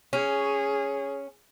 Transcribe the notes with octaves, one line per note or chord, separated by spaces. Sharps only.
C#4 G#4